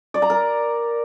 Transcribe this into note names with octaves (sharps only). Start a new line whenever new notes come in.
D5
A#5
A#4